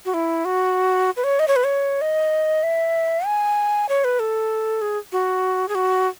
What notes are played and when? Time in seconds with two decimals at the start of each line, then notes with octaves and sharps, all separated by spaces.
0.06 F#4
0.14 E4
0.45 F#4
1.17 B4
1.24 C#5
1.39 D#5
1.48 C#5
1.56 B4
1.64 C#5
2.01 D#5
2.63 E5
3.26 G#5
3.89 C#5
4.04 B4
4.20 A4
4.82 G#4
5.12 F#4
5.68 G#4
5.75 F#4